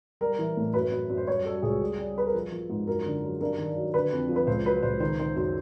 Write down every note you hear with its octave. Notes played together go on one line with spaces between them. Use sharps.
G3 A#4
E3
A2
F#2 B4
F#2
F#2
C5
G3 C#5
G3 A4
C#2 G#4
G3
G3
G3 B4
A#4
F3 A4
F3
G#2
F#2 A#4
D3
F#3
G2 A#4
D#3
F#3
D3 B4
F2
F3
B4
C#2 C5
F#3 B4
C#2 C5
D#3 C5
D#3 C5
F#2 C5